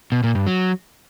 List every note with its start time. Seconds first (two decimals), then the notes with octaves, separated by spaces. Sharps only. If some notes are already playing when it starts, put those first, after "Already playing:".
0.12 B2
0.23 A#2
0.35 G2
0.47 F#3